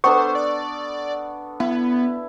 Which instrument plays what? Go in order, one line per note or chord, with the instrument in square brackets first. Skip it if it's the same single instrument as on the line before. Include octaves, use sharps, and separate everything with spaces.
[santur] B3 D4 A4 [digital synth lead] C5 [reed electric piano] C#6
[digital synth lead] D5
[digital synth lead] B3 [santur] E4